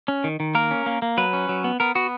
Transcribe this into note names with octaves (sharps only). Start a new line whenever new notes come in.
C#4
D#3
D#3
A#3 A#4
C#4
A#3
A#3
F#3 B4
C#4
F#3
B3
B3 A#4
B3 F#4